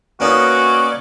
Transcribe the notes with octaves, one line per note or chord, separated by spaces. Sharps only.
A#3 B3 C#4 D#4 F#4 D5